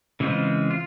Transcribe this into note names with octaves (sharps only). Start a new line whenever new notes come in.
C#3 E3 G#3 C4 F4
F4